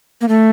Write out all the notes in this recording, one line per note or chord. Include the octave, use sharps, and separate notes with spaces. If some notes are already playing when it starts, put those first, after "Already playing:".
A#3
A3